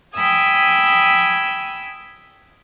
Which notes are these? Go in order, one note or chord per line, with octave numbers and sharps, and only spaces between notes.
G5 G#5 B5 D#6 E6 G#6